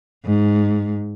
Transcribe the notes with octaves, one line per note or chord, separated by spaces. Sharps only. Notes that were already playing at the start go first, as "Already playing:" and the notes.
G#2